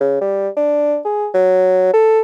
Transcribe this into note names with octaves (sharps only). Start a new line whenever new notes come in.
C#3
G3
D4
G#4
F#3
A4